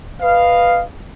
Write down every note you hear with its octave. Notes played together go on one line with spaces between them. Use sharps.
B4 D#5 F5